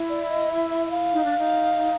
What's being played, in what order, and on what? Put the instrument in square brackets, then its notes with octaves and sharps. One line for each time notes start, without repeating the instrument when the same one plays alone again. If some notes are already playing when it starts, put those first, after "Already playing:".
Already playing: [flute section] E4
[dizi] D5
D#5
E5
E5
E5
F5
[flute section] D#4
D4
D#4